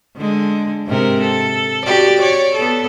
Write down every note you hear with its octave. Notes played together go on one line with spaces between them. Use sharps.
D3 G#3
G#2 C3 A#4
A4
F#4 G4 D5
C#5 D5
B3 A4